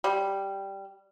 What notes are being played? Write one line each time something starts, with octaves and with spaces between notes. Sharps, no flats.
G3